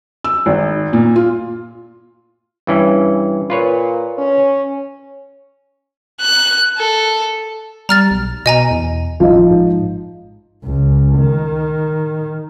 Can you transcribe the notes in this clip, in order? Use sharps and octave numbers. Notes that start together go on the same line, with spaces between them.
E6
G#1
A#2
F4
G2 E3 C#4
A#2 F4 B4 C#5
C#4
F#6
A4
G3 A#5 F6 A6
B1
B2 D#5 G#5 A#5
E2
A1 F3 D#4
G#2
C#2
D#3